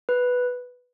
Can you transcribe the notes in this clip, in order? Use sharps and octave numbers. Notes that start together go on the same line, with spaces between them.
B4